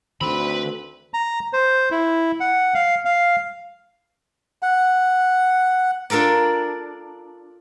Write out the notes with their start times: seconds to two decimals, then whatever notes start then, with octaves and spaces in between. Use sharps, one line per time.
0.21 D2 D#3 C4 B4 B5
1.14 A#5
1.53 C5
1.91 E4
2.40 F#5
2.74 F5
3.05 F5
4.63 F#5
6.10 D4 F4 A4 A#4 D5